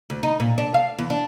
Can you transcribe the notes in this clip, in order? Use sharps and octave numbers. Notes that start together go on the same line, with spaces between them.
D2
D#4
A#2
D4
F5
E2
D4